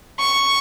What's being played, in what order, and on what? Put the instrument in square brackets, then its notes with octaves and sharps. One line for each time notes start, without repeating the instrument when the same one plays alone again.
[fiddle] C#6